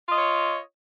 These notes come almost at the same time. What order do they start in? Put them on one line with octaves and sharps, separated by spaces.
F4 D#5 C#5